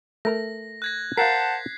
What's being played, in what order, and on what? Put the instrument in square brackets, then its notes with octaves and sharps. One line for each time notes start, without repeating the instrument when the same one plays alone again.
[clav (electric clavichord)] A3 A#4 A#5 [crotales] A#6
[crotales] F#6 G#6 A#6
[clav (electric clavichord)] A#4 F5 [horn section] C5 F#5 A5 [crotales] B6 C7